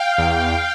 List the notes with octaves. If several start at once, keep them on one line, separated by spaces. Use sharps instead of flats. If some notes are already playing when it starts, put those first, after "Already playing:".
Already playing: F5 G5
E2